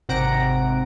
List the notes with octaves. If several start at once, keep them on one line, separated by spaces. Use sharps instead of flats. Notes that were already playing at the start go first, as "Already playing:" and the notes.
G#1 C3 F#5 A#5 A#6 D7